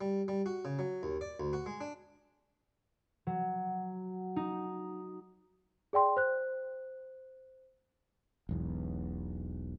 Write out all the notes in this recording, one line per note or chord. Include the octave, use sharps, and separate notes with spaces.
G3
G3
F#4
C#3
F#3
D#2
D5
D2
F#4
G#3
D4
F#3
D#4
G#4 D5 G5 C6
C5 F#6
E1 B1 E2